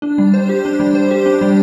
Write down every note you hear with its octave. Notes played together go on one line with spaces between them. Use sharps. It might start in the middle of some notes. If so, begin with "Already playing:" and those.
D4
G3
C5
G4
D4
G3
C5
G4
D4
G3